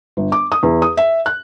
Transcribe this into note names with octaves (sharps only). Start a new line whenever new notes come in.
G1
D6
D#6
E2
D#6
E5
F#6